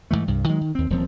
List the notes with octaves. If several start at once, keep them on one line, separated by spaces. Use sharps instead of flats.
G#2 C3 E3 A3
C2 G2
D#3 F#3 G#3
D#3
D#2 C4
D#1 F3 C4